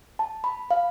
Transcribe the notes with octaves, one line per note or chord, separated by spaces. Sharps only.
A5
B5
F5